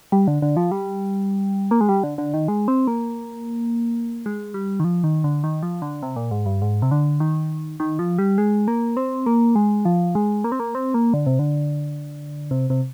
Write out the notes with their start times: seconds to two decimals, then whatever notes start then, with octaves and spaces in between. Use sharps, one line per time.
0.12 G3
0.28 D3
0.42 D3
0.56 F3
0.71 G3
1.71 A#3
1.81 G#3
1.89 G3
2.04 D3
2.18 D3
2.34 D#3
2.48 G#3
2.68 C4
2.87 A#3
4.26 G#3
4.54 G3
4.80 D#3
4.84 F3
5.04 D#3
5.24 D3
5.44 D#3
5.63 F3
5.82 D3
6.03 C3
6.16 A#2
6.31 G#2
6.46 G2
6.62 G#2
6.82 C3
6.91 D3
7.20 D#3
7.80 D#3
7.99 F3
8.18 G3
8.38 G#3
8.68 A#3
8.97 C4
9.26 A#3
9.56 G#3
9.85 F3
10.15 G#3
10.44 A#3
10.52 C4
10.60 A#3
10.75 C4
10.94 A#3
11.14 D3
11.26 C3
11.39 D3
12.51 C3
12.70 C3